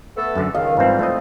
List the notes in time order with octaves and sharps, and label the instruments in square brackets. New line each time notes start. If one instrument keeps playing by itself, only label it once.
[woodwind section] A3 B3 A4
[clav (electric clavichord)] F#2 D3
[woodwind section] C#2 D#3 [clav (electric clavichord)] D#5 [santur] F5
[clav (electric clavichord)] G#2 C4 [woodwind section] E3 F3 G3
[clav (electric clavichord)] A3 C4 D#5